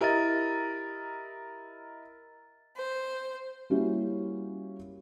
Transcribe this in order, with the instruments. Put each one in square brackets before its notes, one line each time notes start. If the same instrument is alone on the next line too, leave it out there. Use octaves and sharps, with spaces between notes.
[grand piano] E4 A#4 D#5 [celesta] G4 [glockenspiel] A#5 A6
[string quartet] C5
[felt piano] G3 A#3 C#4 E4 F#4 G4